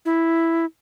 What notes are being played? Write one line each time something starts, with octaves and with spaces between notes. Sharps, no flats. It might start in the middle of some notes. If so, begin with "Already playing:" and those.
E4